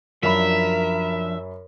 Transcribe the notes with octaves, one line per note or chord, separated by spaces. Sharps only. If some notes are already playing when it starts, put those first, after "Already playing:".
F#2 F3 D4 A#4 E5 F5 B5